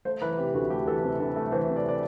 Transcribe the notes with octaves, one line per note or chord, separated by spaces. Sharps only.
A3 C5
E3 B4
C3 G4
D2 F#4
A3 G4
E3 A4
C3
D2
A3
E3 C5
C3
D5
D5